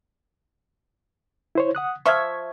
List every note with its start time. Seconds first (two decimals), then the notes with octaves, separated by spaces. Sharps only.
1.55 E4 C5 C#5
1.75 F#5 D#6 F#6
2.06 F3 F4 E5 C#6 G#6